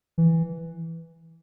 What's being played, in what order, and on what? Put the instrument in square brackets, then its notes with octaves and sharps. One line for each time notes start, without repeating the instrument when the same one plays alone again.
[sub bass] E3